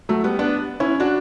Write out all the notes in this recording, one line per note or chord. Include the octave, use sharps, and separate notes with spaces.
F#3 A3
G3 B3
B3 D4
C#4 E4
D4 F#4